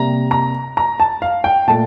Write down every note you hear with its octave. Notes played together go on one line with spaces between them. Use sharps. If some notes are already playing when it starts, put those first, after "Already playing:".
Already playing: C3 G3 A#3 A#5
A#5
A#5
A5
F5
G5
A#2 A3 A5